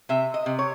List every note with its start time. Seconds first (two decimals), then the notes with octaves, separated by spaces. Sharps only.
0.09 C3 E5
0.34 D#5
0.46 C3
0.59 C#5